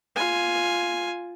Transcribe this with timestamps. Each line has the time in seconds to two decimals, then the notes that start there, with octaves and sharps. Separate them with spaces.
0.16 F4 G#5